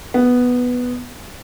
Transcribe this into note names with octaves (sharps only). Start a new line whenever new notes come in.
B3